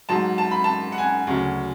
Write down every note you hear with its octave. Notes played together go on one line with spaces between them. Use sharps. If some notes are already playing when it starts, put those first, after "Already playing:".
G#2 F#3 A5
A5
B5
A5
F#5
G#5
D2 C#3 F#3